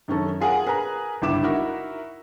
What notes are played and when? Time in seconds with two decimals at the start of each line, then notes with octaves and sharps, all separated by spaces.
0.08 F#2 D#3 C#4 A4
0.40 F4 G#4 A#4 F#5 G#5
0.66 G#4 A#4 B4 A#5
1.22 G1 C#2 E4 D6 E7
1.43 D#4 E4 F#4 A#4 E5